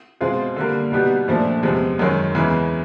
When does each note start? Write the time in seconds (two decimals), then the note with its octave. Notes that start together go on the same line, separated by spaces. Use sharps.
0.21 B2 G#3 C4 F4 G#4
0.56 D3 G3 A#3
0.92 B2 G3 B3 D#4 G4
1.28 A#2 F3 A3 D4
1.63 E2 C3 F3 G#3
1.99 F#2 D#3 G#3 C#4
2.35 E2 C#3 E3 G#3